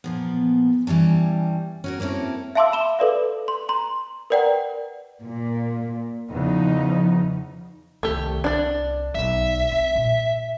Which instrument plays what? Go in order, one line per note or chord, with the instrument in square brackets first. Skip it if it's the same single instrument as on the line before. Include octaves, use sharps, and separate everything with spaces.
[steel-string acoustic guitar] A#2 F3 B3
G2 E3 G3 C#4 A5
C#4 F#4 A#4
A#3 C4 C#4 E4 A4
[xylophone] E5 F5 A5 C6 D6 E6
B5 E7 G7
A4 B4 D5 F5
C6
A#5 C6
A#4 B4 D5 F#5 G5 A#5
[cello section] A#2
[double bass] E2 C#3 [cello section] F3 D#4
[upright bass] C2 D#3 [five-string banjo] A3 G4
[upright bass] C2 [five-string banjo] D4 D5
[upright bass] B1 [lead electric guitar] E5
[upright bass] C4
A#2